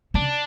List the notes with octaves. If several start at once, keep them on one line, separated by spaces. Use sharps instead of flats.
C#3 D4